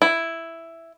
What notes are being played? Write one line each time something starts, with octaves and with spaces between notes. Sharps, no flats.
E4